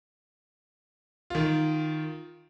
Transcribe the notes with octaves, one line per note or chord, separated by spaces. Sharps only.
D#3 F4